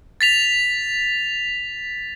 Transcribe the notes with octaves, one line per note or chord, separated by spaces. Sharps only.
A6 B6 F7